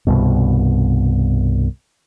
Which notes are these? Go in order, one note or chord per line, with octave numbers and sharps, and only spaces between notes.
C2 G2 B2